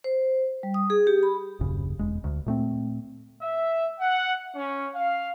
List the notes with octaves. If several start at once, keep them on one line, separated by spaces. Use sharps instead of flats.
C5
G3
D#6
G#4
G4
B5
D#1 A#1 F#2 C#3
E1 G#3
D2
A#2 A3 C4
E5
F#5
C#4
F5